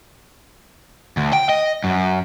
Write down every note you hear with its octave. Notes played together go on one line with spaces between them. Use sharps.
D2
G5
D#5
F#2